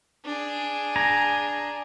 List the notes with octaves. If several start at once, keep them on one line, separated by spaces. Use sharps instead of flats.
D4 G#4
G#5 A#5